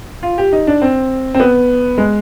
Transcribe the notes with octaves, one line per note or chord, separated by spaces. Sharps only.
F4
G4
D#4
D4
C4
C4
B3
G#3